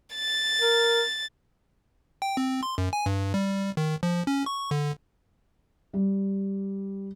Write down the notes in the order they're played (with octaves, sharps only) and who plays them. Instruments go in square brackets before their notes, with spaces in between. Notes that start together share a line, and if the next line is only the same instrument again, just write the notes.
[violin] A6
[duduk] A#4
[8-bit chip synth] G5
C4
C6
F#2
G#5
G2
G3
D#3
F3
C#4
C#6
D3
[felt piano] G3